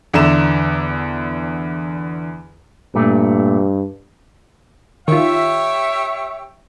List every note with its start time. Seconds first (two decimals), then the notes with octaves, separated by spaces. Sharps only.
0.13 E2 D3 E5 A#5 E7
2.95 G2 A#2 A3
5.08 D#3 F4 G4 C#5 E5